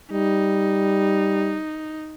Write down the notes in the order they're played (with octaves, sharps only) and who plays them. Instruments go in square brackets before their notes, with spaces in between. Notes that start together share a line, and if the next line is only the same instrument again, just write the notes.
[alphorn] G3 [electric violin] D#4